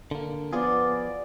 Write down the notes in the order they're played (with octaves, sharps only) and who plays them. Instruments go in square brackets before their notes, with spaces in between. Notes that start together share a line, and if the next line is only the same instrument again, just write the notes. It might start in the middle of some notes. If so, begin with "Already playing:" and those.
[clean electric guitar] D3 A#3
[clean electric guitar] F3 F4 G#4 [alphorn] B3 [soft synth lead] D5